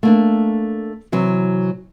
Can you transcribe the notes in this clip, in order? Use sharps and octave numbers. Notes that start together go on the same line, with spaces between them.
A3 A#3 D4
C3 E3 F#3